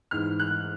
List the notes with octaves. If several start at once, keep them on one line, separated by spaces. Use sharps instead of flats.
G#2 E3 F6
F#6